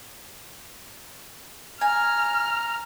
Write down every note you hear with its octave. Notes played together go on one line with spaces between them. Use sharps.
G#5 A#5 F6